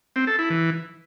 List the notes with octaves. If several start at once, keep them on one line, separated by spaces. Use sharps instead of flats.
C4
A4
E4
E3